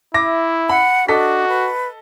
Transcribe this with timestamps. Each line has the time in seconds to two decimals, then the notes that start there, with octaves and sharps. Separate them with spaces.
0.14 E4 E5 D6 A#6
0.69 F#5 B5
1.08 D4 F#4 A4 D#5 B6
1.48 B4